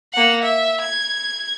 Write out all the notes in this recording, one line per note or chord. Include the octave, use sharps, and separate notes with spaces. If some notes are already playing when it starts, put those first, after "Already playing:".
A#3 F#5
E5
G#6